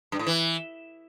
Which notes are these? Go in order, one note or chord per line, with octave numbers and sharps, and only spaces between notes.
G2
A2
E3